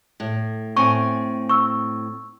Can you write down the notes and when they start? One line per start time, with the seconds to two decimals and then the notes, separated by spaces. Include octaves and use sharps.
0.20 A2
0.77 A2 C4 G#5 C#6
1.49 C#6 E6